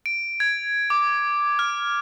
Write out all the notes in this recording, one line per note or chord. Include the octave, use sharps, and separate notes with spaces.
D7
G#6
D6
F6